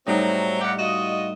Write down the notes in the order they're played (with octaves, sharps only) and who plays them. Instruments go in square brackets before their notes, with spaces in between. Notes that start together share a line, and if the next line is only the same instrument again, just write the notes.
[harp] A2 G3 D#4 [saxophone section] F#3 C4
[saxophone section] F2 G4 F#5
F4 F#4 D#5